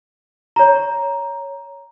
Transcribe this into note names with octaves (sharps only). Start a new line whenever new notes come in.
C#5 A#5